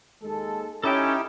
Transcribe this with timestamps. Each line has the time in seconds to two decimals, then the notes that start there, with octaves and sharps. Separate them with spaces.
0.22 D#2 G#3 A4
0.84 C#4 D#4 E4 G4 A4 E5 G5